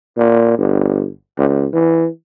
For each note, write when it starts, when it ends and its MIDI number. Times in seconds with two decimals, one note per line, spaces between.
0.17 0.58 46
0.58 1.07 31
1.38 1.66 37
1.73 2.08 52